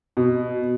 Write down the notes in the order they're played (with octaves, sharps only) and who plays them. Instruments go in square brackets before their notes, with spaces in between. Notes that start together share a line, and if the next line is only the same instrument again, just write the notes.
[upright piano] B2